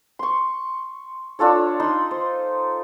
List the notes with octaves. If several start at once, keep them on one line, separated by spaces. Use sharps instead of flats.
C6 C#6
D4 F4 A4 C#5
D#4 B5 C6
C5